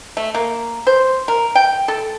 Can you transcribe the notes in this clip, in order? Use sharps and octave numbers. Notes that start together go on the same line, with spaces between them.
A3
A#3
C5
A#4
G5
A4